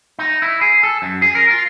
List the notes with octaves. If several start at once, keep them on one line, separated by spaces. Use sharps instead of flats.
D#4
E4
G#4
A4
F#2
G#4
A#4
F4